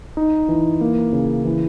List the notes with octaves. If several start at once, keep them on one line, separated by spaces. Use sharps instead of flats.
D#4
E3
A#3
C#3
E3